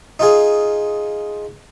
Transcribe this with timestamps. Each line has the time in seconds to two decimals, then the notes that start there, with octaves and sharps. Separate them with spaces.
0.19 D#4 F4 G#4